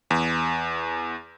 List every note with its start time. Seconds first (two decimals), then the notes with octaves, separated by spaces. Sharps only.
0.10 E2